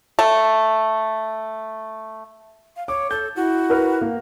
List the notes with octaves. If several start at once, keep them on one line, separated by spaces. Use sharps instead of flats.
A3 A4
F5
C#5 D6
A4 G6
E4 F#4
A#4 B4 F6
A#3